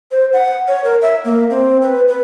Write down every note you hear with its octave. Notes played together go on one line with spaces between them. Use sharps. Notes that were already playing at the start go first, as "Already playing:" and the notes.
C5
F#5
C#5
A#4
E5
A#3
C4
B4
B4